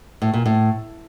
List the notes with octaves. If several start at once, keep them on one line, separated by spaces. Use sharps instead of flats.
A2
A#2
A2